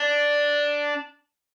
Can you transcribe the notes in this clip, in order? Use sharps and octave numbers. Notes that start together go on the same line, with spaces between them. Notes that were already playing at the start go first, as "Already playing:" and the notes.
Already playing: D4